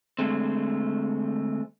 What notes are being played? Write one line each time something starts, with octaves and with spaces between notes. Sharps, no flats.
D3 G#3 A3 C4